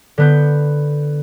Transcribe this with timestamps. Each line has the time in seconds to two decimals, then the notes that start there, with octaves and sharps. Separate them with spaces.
0.18 D3 B3 G6